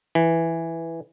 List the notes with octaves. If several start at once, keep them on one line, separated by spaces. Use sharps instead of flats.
E3